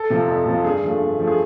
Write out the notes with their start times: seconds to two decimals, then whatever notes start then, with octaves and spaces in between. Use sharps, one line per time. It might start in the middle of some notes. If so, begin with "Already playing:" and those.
Already playing: A4
0.10 C3 F3
0.27 F2
0.46 C3 F3
0.64 G2 G#4
0.82 D3 F3 A3
1.00 G2
1.18 D3 F3 A3
1.27 G#4